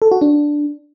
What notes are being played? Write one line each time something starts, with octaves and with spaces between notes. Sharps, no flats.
A4
F#4
D4